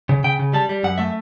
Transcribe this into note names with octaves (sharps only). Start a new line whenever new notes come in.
C#3
C#3 G5
C#3
G3 A5
G3
F#2 F#5
A3 E5